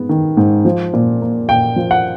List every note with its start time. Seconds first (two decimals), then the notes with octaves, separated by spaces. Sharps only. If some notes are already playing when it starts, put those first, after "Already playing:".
Already playing: G#2 G#3 B3
0.09 D#3
0.37 G#2
0.65 F3
0.94 A#2
1.21 A#3
1.49 A#2 G5
1.76 F3
1.91 F#5